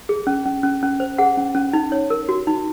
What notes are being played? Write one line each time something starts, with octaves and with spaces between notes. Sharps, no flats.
G#4
C#4
C#4
C#4
C#4
C5
G#4 F#5
C#4
C#4
D#4
C#5
A#4
F#4
D#4